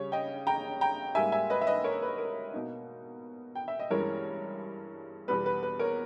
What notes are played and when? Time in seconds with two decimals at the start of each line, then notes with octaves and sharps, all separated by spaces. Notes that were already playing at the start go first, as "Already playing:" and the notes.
Already playing: C#3 G3 C#4 C#5
0.12 D#5 G5
0.47 G5 A#5
0.81 G5 A#5
1.15 G#2 G3 A#3 E5 G#5
1.32 E5 G#5
1.50 B4 D#5
1.61 E5
1.67 B4 D#5
1.84 A#4 C#5
2.02 B4
2.18 A#4
2.53 B2 A#3 D#4
3.55 G5
3.68 E5
3.80 D#5
3.91 G2 E3 G#3 C#4 A#4 C#5
5.28 E2 B2 G3 B3 B4
5.46 B4
5.63 B4
5.79 A#4 C#5